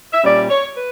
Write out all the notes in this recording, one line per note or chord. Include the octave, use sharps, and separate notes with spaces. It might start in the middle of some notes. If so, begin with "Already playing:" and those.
E5
A#2 G3 C#4 D5
C#5
B4